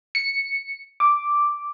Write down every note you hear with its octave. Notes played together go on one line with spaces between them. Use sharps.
C#7
D6